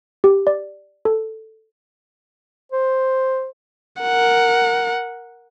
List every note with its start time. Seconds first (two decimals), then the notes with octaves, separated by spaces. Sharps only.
0.24 G4
0.47 D5
1.05 A4
2.72 C5
4.01 A#4 F#5